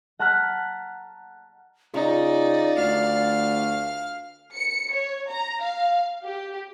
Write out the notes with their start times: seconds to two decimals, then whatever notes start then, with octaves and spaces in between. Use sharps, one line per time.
0.19 F#5 A5 A#5 F6 F#6 B6
1.94 C#3 D#4 F4 D5
2.78 D2 F5 F6
4.55 C#7
4.92 C#5
5.30 A#5
5.62 F5
6.24 G4